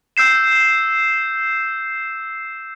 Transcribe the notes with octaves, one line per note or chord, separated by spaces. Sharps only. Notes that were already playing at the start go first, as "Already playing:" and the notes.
E6 G6 C7 E7